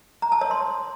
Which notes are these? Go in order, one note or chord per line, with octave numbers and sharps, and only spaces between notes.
A#5
A5
C#5
C6